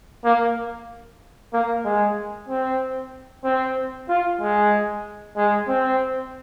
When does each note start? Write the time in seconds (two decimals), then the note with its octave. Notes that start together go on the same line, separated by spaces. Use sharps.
0.24 A#3
1.53 A#3
1.85 G#3
2.48 C4
3.44 C4
4.09 F4
4.41 G#3
5.37 G#3
5.68 C4